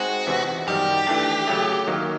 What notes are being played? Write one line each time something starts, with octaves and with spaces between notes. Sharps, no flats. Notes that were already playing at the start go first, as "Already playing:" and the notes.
Already playing: G#3 C4 D#4 F#4 G#4 C5
E2 C3 E3
F#2 D#3 G3 G4
E3 A3 D4
C#3 F#3 A3
D#3 F#3 A#3